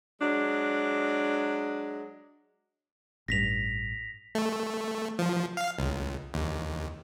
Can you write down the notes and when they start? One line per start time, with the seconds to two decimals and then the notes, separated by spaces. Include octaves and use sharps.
0.21 F#3 G#3 D4
3.28 A1 G2 A#6 B6 F7
4.35 A3
5.19 F3
5.57 F5
5.79 C#2
6.34 D#2